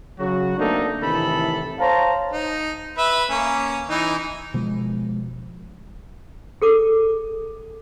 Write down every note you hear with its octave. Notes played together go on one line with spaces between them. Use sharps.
C#3 F#3 F#4
A3 A#3 C4 D4 D#4 A4
A2 C3 D#3 E3 A4 B5
C5 C#5 F5 A5 A#5
D#4
B4 E5
A#3 C#4
E3 D#4
B2 F3 G#3
G#4 A4 D6